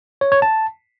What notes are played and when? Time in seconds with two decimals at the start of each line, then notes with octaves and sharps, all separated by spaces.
0.21 C#5
0.32 C#5
0.42 A5